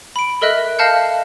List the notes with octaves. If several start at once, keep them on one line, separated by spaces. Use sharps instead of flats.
B5 D7
A4 A#4 D#5 E5 F#6
D#5 F5 A5 F6 G6 C#7